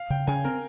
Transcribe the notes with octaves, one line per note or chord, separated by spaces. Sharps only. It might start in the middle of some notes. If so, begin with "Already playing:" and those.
Already playing: F5
C#3 G5
C#3 G#5
C4 A#4